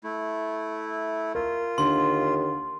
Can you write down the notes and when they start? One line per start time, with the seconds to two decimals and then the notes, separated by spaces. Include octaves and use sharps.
0.04 A3 E4
1.35 F4 A#4
1.78 D#2 D3 C6